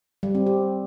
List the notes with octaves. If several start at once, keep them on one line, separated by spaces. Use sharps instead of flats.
G3
C4
G4